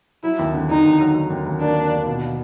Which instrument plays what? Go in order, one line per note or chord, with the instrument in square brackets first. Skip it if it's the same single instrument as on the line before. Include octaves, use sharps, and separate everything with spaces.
[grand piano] F#3 [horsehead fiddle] E4
[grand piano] D#2
D3
[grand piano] D#2 [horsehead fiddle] D#4
[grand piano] D#2
F#3
F#3
D#2
D#2
[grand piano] A#3 [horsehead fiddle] D4
[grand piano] A#3
D#2
B2